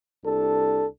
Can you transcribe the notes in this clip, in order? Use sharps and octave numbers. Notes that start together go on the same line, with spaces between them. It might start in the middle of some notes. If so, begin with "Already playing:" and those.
C2 D4 A4